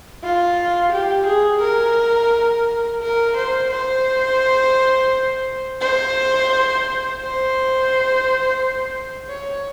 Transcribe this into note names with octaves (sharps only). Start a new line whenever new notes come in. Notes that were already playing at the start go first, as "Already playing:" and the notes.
F4
G4
G#4
A#4
A#4
C5
C5
C5
C5
C#5